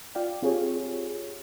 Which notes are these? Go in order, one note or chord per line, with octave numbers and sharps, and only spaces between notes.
F4 D5 F5 G5
C4 F4 G4 G#4 C#5